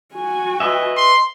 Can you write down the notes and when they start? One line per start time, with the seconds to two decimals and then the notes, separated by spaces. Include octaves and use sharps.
0.14 F#4 G#5
0.60 B4 D#5 E5
0.97 C6